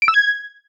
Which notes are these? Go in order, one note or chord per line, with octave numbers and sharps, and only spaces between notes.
D7
E6
G#6